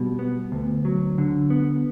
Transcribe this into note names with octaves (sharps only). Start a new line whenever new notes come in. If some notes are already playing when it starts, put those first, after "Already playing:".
Already playing: B2 G3
B3
D2
F#3
D3
B3